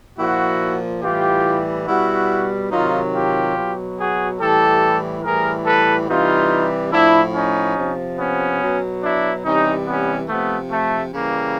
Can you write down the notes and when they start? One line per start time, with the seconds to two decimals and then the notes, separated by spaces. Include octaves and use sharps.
0.18 A#2 F3 E4 F#4
1.03 A2 E3 G3 F4 G4
1.88 B2 G3 E4 F#4
2.72 C3 D#3 F#3 D#4 F4
3.13 F4 G4
3.55 B2 F#3
3.98 F#4 G#4
4.39 A2 E3 G3 G4 A4
5.24 A2 E3 G3 G#4 A#4
5.66 A4 B4
6.08 C3 E3 G3 D#4 F4
6.92 A2 F3 D4 E4
7.34 C#4 D#4
7.76 C3 F3
8.19 B3 C#4
8.60 B2 F#3
9.02 D4 E4
9.44 C3 E3 G3 C#4 D#4
9.87 B3 C#4
10.28 C3 F3 A3 B3
10.70 A3
11.12 C#3 E3 G3 A#3